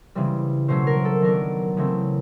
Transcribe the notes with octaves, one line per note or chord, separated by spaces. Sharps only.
C#3 E3 G3 C4
B2 F#3 A3 C#4 C5
A#4
A4
D#3 F#3 B3 D4 A#4
C#3 E3 A3 C4